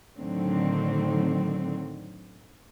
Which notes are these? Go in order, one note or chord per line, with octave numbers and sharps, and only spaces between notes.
A2 D3 D#3 F#3 C4